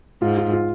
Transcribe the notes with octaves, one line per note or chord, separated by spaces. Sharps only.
G#2 F4
F4
F4